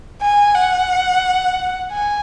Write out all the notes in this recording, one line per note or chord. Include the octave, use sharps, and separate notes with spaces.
G#5
F#5
G#5